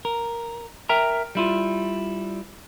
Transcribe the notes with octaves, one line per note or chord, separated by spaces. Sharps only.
A#4
A#4 E5 G5 A#5
G3 E4 F4